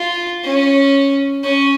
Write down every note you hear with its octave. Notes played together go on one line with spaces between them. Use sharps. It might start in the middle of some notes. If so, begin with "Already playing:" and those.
Already playing: F4
C#4
C#4